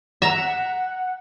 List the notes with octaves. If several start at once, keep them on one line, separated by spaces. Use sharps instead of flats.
E5 F#5 A#5